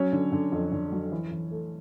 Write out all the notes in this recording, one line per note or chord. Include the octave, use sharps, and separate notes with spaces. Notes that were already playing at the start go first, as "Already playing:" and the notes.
Already playing: F#3 C#4 C#5
D3
D3
F2
D3
F#3
E3
E3
A3